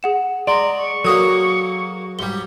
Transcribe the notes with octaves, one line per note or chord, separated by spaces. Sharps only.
G#4 F#5 E7
G#3 D5 A#5 C6
C#6
F#3 A#3 F#4 G#4 A4 D#6
G#2 G3 G7